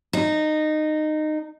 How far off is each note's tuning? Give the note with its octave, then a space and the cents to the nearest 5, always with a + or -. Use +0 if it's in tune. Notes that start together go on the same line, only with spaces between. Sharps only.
D#4 -15